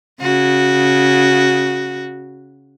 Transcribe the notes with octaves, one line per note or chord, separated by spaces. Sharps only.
C#3 F#4